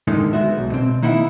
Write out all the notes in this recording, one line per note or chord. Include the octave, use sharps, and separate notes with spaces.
A2 D3 D#3 G#3 D#4
G#3 B3 F#4 E5
B1
B2 C4
D#3 A#3 D#4 E4 F#5